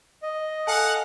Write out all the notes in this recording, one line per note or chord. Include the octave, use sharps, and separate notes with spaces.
D#5
A4 F5 F#5 G#5 A5